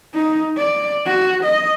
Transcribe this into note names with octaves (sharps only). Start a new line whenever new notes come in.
D#4
D5
F#4
D#5